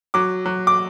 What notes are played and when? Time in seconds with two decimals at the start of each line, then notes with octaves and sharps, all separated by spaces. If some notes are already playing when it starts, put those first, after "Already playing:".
0.14 F#3 D6
0.46 F#3
0.67 D6